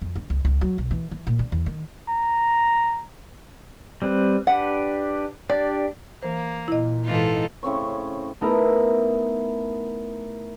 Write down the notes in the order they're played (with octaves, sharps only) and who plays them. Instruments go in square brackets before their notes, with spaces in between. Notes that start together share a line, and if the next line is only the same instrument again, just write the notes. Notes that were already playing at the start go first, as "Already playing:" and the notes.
[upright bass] F2
D3
C#2
C#2
F#3
B1
E3
E3
A#2
D4
E2
D#3
[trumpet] A#5
[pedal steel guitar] G3 C4 B4
[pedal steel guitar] D4 G4 B4 [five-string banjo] F#5
[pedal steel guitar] D4 G4 [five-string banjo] D5
[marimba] E3 C5 [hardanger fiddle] A#3
[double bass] A#2 [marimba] E4 D#5
[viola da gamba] G#2 E3 D#4 [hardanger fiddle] F4 A4
[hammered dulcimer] A2 C#3 C4 C#5
[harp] A3 B3 D#4 E4 A4 A#4